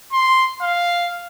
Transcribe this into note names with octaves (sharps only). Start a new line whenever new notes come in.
C6
F5